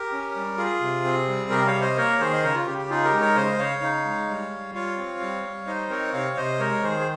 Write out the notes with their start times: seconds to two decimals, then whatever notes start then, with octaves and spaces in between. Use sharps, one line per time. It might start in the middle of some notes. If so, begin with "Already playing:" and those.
Already playing: G4 A#4
0.12 C#4
0.36 G3
0.58 F4 G#4
0.81 C3
1.04 C4
1.28 G3
1.50 C3 G4 A#4
1.66 C#5 F5
1.75 C3
1.81 C5 D#5
1.97 A#3 A#4 C#5
2.20 D#3 G#4 C5
2.33 D#5
2.43 C#3 A#4 C#5
2.55 F4
2.66 C#3 G4
2.78 G4
2.90 D#4 F4 G#4
3.04 G4 A#4
3.13 G#3
3.21 A#4 C#5
3.35 C#3 C5 D#5
3.58 C#3 C#5 F5
3.81 D#4
4.05 G#3
4.29 G3
4.51 G3
4.74 F4 C#5 F5
4.97 C4
5.20 G3
5.45 G3
5.67 D#4 C5 D#5
5.90 C4 A#4 C#5
6.13 C3 C#5 F5
6.37 C3 C5 D#5
6.59 G#3 A#4 C#5
6.83 D#3 G#4 C5
7.00 G#4